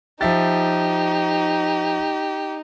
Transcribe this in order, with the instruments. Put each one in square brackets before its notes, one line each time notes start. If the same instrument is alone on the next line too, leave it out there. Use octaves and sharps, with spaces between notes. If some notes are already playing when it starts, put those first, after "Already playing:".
[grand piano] F3 E5 A6 [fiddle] D#4 [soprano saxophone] G4